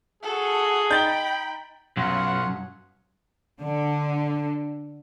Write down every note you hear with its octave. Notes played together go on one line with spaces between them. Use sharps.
F#4 G#4 A4
D#4 G5 B5 G6 A6 G7
B1 F#2 F4 C#5 F5 F#5
D3